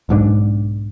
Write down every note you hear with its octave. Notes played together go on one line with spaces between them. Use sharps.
B1 G#2 F3 D4